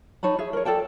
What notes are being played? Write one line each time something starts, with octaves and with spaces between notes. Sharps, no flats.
D#4 C#5 A5 B5
G#4 E5
A#4 C#5
A4 D5 G5 A5